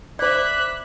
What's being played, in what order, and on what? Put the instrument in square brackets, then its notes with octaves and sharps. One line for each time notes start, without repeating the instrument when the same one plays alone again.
[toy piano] C5 D5 [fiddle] E5 B5 [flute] D6 [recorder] F#6